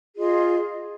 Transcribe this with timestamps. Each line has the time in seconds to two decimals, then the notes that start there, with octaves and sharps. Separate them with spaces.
0.16 F4 G#4 D#5 C6